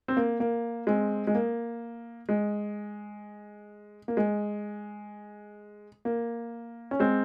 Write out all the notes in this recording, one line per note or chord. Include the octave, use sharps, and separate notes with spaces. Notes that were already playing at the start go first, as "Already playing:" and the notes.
C4
A#3
A#3
G#3 C4
G#3
A#3
G#3
A#3
G#3
A#3
C#4
G#3 C4